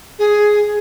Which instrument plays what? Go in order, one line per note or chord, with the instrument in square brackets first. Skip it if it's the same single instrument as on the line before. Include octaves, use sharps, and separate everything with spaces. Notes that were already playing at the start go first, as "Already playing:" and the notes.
[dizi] G#4